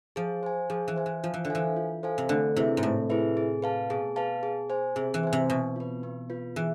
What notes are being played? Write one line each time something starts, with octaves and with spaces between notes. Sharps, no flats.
F3 G#4
C5 G#5
F3 G#4
E3
C5 G#5
E3
F3 F4
E3
D3
E3 A4 C5 F5 G#5
F4
A4 C5 F5 G#5
C3
D3 A3
C3 E4 G#4 B4 E5
G#2
A2 A3
E4 G#4 B4 E5
G#4
B4 F5 A5
B2 G#4
B4 F5 A5
G#4
C5 G#5
C3 G#4
E3
C5 G#5
C3
B2 B3
F4 B4
B3
F4 B4
E3 G#4